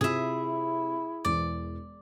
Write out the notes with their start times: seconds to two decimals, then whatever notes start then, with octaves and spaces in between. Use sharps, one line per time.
0.01 C3 E4 F4 G#4 E5
1.25 E1 E3 D5